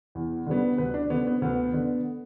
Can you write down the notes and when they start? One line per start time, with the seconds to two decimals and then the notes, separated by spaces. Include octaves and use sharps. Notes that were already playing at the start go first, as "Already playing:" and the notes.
0.15 E2
0.46 D3 G3 B3
0.78 D2 B4
0.94 D4
1.10 D3 B3
1.27 B3
1.42 D2 B3
1.74 D3 B3